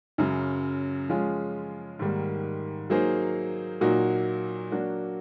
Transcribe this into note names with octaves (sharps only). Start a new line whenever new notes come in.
F#2 C#3 F#3
F3 G#3 C#4 F4 G#4
G#2 D#3 G3 A#3
F#3 A#3 D#4 G#4 C5
A#2 F#3 A#3 D#4 F#4
F#3 A#3 D4 F#4